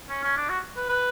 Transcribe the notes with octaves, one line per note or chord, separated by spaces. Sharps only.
C#4
C#4
D4
F#4
B4
B4